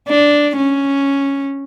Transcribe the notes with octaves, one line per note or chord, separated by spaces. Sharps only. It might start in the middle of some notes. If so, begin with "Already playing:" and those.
D4
C#4